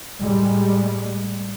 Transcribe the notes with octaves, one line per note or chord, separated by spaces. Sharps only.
A2 G3 G#3